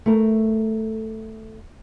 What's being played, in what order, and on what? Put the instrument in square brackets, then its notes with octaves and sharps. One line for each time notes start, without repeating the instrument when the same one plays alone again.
[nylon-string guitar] A3 A#4